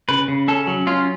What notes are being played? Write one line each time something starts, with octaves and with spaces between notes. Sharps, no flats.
C#3 B4
C#3
C#4 A4
F#3
C#4 F4